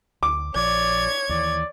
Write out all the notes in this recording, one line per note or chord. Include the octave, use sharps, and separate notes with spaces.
D2 D6
A#1 F3 C#5 D5 G#6
D#2 E3 D5